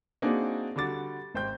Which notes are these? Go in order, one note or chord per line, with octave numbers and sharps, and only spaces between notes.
A#3 C4 D4 D#4 F#4 G#4
D3 G3 F#4 D6 A6
G#1 C5 G5 G6